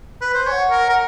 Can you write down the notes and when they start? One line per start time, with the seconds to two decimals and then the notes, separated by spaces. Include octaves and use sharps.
0.21 B4
0.34 C5
0.47 C#5 G#5
0.52 F#5
0.70 A#4
0.89 A#4